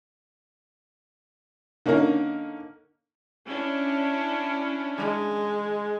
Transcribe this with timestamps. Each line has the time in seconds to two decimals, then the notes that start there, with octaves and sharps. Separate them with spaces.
1.86 D3 A#3 C#4 D#4 A#4
3.47 C#4 D4 E4
4.97 G#3